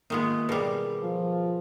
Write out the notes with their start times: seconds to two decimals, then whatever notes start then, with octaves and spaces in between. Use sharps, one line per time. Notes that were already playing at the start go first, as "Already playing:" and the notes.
0.10 D#3 G#3 A#3 B3 F4
0.49 B2 G3 G#4 A#4 B4
1.03 F3